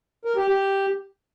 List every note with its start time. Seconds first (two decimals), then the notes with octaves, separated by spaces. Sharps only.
0.25 A#4
0.37 G4
0.48 G4